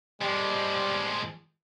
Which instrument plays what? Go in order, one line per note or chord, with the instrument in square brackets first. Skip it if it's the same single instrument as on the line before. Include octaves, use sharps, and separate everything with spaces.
[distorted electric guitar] F3 G#3 [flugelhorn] G3